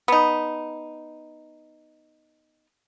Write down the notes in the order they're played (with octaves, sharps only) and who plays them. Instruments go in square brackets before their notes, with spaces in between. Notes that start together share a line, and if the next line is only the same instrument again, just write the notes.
[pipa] B3 D#4